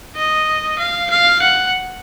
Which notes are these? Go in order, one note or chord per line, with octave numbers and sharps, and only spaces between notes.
D#5
F5
F5
F#5